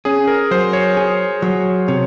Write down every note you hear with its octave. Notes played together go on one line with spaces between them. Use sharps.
C#4 G#4
A#4
F#3 C5
C#5
G#4
F#3
C3 C#5